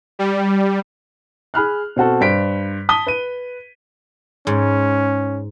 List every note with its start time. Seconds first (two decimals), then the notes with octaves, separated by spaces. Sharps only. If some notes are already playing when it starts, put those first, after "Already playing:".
0.19 G3
1.54 G#4 B5 F6 F#6
1.96 B2 C4 F#4 A4
2.21 G2 C5 B6 D7
2.89 A5 D#6 B6 G7
3.07 B4 D#7
4.47 G#2 C#4